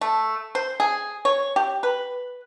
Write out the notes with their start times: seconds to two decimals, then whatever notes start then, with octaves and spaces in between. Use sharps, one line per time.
0.01 A3
0.55 C5
0.80 G#4
1.25 C#5
1.56 G4
1.83 B4